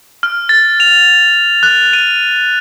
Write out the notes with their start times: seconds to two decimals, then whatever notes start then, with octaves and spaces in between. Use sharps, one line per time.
0.23 F6
0.49 A6
0.80 F7
1.63 F#6
1.93 D#7